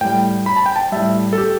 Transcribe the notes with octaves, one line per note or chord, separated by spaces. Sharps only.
A2 G3 G5
B5
A5
G5
A5
A2 G3 E5
A4
G4